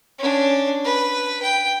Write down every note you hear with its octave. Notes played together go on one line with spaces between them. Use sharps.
C#4 D4
B4
G5